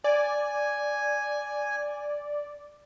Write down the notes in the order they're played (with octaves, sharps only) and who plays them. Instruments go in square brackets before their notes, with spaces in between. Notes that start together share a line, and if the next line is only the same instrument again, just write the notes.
[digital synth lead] D5 [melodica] G#5